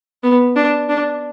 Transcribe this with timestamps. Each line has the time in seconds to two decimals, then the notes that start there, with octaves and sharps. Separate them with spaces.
0.23 B3
0.56 D4
0.89 D4